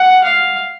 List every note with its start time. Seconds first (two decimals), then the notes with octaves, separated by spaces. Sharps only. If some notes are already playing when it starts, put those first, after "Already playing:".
Already playing: F#5
0.24 F5